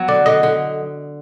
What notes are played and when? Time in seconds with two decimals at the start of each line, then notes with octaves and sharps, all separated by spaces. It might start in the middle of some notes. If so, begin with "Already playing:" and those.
Already playing: F#3 B3
0.08 D3 D5
0.26 D3 D#5
0.43 D3